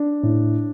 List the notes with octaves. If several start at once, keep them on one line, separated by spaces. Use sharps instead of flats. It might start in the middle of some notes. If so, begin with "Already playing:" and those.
Already playing: D4
A2